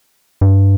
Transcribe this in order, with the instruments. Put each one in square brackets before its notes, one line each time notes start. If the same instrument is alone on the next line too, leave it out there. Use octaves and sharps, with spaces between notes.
[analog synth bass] G2